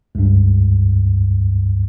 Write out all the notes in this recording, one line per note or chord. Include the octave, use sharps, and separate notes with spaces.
C#2 G2